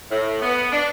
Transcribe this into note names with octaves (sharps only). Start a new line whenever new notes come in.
A2
B3
D4